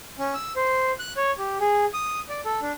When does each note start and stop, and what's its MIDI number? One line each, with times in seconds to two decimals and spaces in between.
0.19 0.34 61
0.34 0.52 88
0.56 0.91 72
0.99 1.13 90
1.17 1.32 73
1.38 1.57 67
1.60 1.85 68
1.94 2.20 87
2.29 2.41 74
2.45 2.60 69
2.62 2.72 62